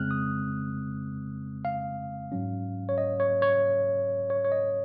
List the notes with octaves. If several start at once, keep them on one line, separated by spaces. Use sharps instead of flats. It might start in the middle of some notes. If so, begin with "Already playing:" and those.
Already playing: F2 C#3 G#3 C4 F6 F#6
D#6
F5
G#2 F#3 C#4
C#5
D#5
C#5
C#5
C#5
C#5
D#5